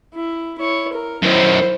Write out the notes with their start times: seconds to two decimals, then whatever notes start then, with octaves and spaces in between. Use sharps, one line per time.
0.14 E4
0.58 E4 C#5
0.93 A#4
1.23 F#2 D#3 E4 C5